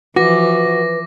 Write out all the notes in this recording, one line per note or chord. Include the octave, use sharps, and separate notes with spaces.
E3 F3 F#4 B4 D6 A#6